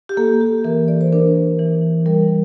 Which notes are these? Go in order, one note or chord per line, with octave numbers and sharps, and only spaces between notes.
G4
A#3 A4
G4
E3 A#4
D5
C5
D4 A#4
E3
G3 A#4